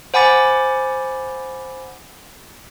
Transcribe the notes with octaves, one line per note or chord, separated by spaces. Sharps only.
C5 F#5 G#5 B5 D6 A6